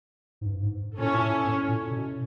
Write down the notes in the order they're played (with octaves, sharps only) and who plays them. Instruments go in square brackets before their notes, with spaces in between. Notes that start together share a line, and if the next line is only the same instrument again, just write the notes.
[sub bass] G#2
G2
G#2
[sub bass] A#2 [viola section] C#4 E4 A4 C#5
[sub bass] A#2
A2
A2
A#2
B2